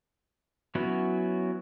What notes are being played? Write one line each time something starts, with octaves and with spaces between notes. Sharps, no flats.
F#3 B3 C#4 E4 F#4